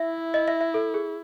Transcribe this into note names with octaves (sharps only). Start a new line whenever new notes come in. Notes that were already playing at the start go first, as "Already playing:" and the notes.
Already playing: E4 E5
D#5
E5
E5
A4
G#4